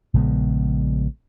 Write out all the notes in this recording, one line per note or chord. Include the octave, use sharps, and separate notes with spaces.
A#1 C#3 G#3 B3